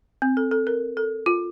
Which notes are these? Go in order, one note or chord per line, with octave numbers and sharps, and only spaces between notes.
C4
A4
A4
A#4
A4
F4